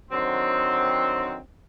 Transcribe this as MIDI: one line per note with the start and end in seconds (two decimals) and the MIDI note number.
0.11 1.37 50
0.11 1.37 51
0.11 1.37 54
0.11 1.37 60